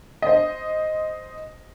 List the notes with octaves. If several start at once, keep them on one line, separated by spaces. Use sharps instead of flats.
C5 D#5